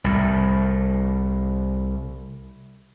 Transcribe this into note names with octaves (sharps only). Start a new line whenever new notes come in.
C2 A2